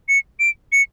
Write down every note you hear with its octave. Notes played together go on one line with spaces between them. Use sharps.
C#7
D7
C#7